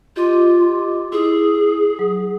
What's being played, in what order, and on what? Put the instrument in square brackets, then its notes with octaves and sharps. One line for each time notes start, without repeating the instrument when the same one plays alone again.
[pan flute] F4 [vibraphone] G4 D#5 D6
[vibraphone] E4 [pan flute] G#4
[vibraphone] F#3